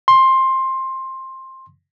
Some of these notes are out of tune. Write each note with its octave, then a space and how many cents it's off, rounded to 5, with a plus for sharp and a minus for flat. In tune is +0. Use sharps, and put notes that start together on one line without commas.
C6 +15